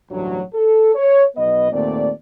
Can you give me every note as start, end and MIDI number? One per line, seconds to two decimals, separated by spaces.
0.11 0.41 33
0.11 0.41 38
0.11 0.41 43
0.11 0.41 54
0.54 0.94 69
0.95 1.24 73
1.36 1.70 35
1.36 1.70 59
1.36 1.70 71
1.36 1.70 75
1.71 2.11 39
1.71 2.11 46
1.71 2.11 57
1.71 2.11 60
1.71 2.11 74